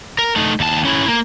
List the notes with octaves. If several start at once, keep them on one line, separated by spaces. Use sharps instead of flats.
A#4
A3 D#4
D#2 A5
C#4 E4
A#3